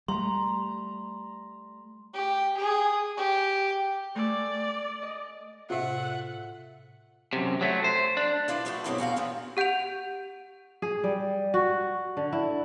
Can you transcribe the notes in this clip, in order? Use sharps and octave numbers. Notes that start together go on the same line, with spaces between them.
G3 A3 A#5 C6
G4
G#4
G4
A3 D5 G#5 E6
D#5
A2 C3 F4 C5 E5 F#5
F#2 C3
F#3 A3
C5
D4
E4 F4 B4 D5
F3 G3 A3 D4 F#4 A4
G2 B2 F#3 C4 D4 E4
E2 F#4 F5 A#5
A#2 E3 F3 A#3 B3 D4
G4 F#5 G6 D7 F7
G#4
G3
F#4
D3
E4